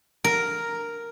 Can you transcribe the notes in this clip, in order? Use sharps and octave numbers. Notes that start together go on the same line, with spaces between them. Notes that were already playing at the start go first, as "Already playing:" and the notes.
A#4